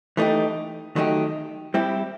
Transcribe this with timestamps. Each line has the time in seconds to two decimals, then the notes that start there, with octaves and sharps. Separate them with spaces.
0.17 E3 A3 D#4 G4
0.96 D#3 F#3 A3 D#4 G4
1.74 G3 C4 E4 G4